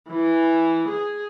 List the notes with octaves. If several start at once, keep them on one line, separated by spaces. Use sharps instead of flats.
E3
G#4